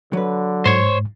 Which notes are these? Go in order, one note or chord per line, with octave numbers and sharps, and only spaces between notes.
D3 F#3 B4
G#2 C5 C#5